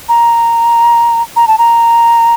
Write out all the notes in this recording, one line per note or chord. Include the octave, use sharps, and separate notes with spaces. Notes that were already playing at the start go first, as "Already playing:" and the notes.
A#5
A#5
A5
A#5